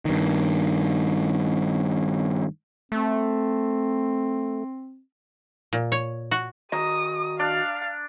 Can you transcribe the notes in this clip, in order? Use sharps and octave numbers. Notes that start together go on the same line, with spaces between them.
G2 D#3
A3 C4
A#2
C#5
F#4
D#3 F#4 D#5 A#5 D#6
D4 F5